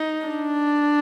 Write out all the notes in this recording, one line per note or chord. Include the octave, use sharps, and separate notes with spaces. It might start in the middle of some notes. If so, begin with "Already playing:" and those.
Already playing: D#4
D4